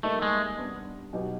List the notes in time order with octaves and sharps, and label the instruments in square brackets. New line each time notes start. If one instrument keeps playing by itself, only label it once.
[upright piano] G3 A#3 D#4 [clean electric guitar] A3
[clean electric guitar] G#3
[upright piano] G3 B3 D4
B2 F#3 B3 D#4 G4